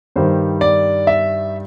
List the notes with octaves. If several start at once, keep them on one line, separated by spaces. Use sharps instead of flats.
G2 D#3 G3 C5
D5
E5